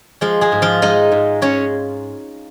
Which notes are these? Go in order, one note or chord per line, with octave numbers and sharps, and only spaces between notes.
F3 G#3 F4
G#3 G#4
G#2
F3 F4
G#3 D#4 D#5
G#2
G#3 C#4 C#5